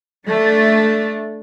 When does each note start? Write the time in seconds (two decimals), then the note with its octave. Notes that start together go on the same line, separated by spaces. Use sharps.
0.25 A3 D4